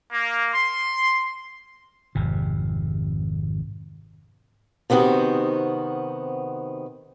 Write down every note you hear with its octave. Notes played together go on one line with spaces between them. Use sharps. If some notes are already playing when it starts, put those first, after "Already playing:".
A#3
C6
G#1 F2 C3
C3 D#3 B3 C4 F#4